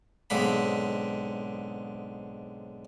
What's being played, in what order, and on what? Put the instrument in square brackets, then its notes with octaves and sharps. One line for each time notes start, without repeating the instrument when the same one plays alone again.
[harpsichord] B1 G#2 D3 C4 B5